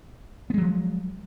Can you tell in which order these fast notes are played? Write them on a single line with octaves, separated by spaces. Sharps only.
B3 G#3 F#3 F3